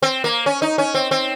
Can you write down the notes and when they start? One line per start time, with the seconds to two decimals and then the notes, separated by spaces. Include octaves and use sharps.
0.03 C4
0.24 A#3
0.46 C#4
0.62 D#4
0.78 C#4
0.94 C4
1.11 C4